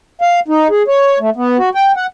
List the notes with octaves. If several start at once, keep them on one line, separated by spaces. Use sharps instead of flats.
F5
D#4
G#4
C#5
A3
B3
F#4
G5
F#5